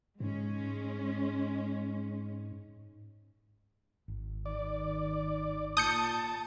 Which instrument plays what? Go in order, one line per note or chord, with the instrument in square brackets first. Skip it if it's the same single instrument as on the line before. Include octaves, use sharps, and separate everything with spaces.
[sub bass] G#2 [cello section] G#3 C#4
[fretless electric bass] G#1
[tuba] D#3 [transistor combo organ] D5
[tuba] A#2 [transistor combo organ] A5 [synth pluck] D#6 G6 C#7